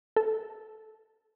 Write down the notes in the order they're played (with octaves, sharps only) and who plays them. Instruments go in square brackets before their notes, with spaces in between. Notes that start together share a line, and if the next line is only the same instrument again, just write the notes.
[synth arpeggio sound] A4